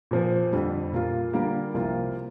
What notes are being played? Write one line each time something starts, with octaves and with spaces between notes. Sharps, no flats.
A#2 F3 C4
F2 D3 G3
A#2 A#3 F4
D3 G3 A#3 F4 A#4
C2 C3 F3 A#3 F4